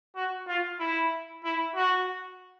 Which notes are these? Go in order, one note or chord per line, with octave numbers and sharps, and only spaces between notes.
F#4
F4
E4
E4
F#4